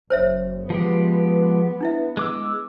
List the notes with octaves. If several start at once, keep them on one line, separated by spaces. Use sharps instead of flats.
F#1 C5 C#5 E5
F3 G#3 B3 G4
D4 E4 E5
G#3 D6 E6